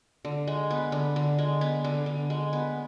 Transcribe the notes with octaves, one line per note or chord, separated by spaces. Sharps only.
D3
G#3
B3
D3
D3
G#3
B3
D3
D3
G#3
B3